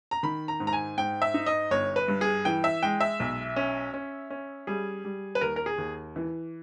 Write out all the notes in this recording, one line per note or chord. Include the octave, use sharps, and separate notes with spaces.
A#5
D#3 B5
A#5
G#2
A#5
G#5
G#2 G5
E5
D#4
D#5
G1 C#5
B4
G2
G#4
E3 G5
E5
G#3 G5
E5
B1
C#4
C#4
C#4
G3 G#4
G3
B4
D#2 A#4
A#4
G#4
D#2
E3